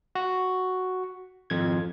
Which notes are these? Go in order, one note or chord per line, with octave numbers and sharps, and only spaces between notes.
F#4
G#1 F2 G#6